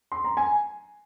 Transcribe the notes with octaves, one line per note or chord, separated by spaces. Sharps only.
C6
A#5
G#5